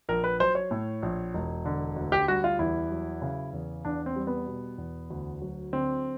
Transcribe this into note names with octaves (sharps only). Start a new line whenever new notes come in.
A#1 A#4
B4
F#3 C5
C#5
A2
A#1
E1
D3
D2
G4
G3 F#4
F4
E2 E4
F#3
C#3
E2
E2 D4
C4
G3
B3
B2
E2
D2
F#3
D3 C4